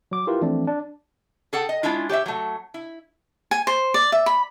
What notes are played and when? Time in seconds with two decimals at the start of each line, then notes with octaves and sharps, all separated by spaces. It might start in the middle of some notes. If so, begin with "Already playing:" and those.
0.11 F#3 D6
0.27 E4 F4 G4 A#4 B4
0.41 E3 F3 A3 C4 D4
0.67 D4
1.53 G#4 A4 F#5 G5
1.69 D#5
1.83 G#3 C#4 D4 E4 F4
2.09 G4 C#5 D#5 E5
2.26 F#3 A3
2.74 E4
3.51 G#5
3.67 C5
3.94 D5
4.12 E5
4.26 B5